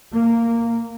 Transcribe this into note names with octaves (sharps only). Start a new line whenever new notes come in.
A#3